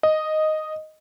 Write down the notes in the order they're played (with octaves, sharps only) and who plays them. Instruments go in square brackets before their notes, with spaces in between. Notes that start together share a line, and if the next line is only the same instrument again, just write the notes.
[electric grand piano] D#5